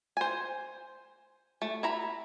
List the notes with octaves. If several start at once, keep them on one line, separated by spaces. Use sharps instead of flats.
C5 G#5
A3
E4 A#5 B5